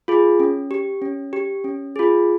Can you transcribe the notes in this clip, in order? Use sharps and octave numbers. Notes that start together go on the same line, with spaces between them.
F4 G#4
C#4
G4
C#4
G4
C#4
F4 G#4